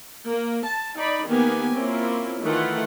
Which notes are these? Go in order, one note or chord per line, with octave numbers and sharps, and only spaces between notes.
A#3
A5
D#4 D5 B5
D#3 A#3 B3 G4 G#5
A#3 C4 C#4 E4 F4
D#3 E3 A3 F4 F#5